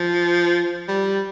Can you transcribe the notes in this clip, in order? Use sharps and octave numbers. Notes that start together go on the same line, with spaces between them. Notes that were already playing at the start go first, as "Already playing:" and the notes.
Already playing: F3
G3